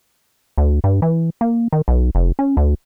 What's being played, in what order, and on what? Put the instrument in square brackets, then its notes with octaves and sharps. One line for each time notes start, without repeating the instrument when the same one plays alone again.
[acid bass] D2
G2
E3
A#3
D#3
B1
F1
C#4
D2